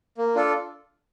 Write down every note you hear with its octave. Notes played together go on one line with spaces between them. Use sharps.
A#3
D4 F4 A4